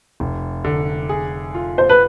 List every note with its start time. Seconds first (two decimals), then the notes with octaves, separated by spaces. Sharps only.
0.20 F1
0.64 D3
1.09 G#4
1.55 F4
1.78 C5
1.89 B4